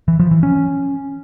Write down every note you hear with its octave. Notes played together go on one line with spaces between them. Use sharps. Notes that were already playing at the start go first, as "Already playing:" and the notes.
E3
F3
E3
C#4